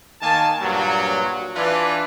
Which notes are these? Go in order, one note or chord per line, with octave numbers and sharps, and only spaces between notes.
D#3 A#3 G#5 A5
G2 A#2 F#3
E3 D4 F4 B4 D5